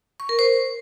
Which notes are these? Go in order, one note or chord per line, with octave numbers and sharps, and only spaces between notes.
C#6
A#4
C5